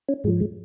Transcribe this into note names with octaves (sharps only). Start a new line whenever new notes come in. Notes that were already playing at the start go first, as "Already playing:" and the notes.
C#4
G#2 F3 G#3
G#3